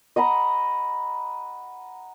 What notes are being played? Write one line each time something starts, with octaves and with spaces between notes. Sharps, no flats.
D#5 F#5 A#5 B5